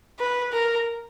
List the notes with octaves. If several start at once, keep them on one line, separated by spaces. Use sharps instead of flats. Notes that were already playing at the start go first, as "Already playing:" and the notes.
B4
A#4